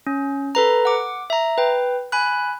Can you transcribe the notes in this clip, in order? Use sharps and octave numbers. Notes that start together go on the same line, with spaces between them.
C#4
A4 B4 A#5
F#5 D6
E5 A#5
B4 G5
G#5 B5 F#6